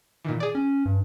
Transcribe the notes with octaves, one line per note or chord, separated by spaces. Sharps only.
A#2 D#3 E3
G#4 D5
C#4
G2